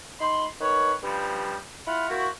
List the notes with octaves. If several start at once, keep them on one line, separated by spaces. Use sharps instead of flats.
D#4 B5 C6
D#3 B4 C#5
G2 C#3 F3 G3
E4 F4 F#5 B5 F6
A#3 C4 E4 F#4